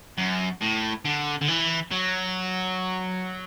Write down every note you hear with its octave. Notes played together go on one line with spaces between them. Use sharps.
F#2
A2
D3
D3
E3
F#3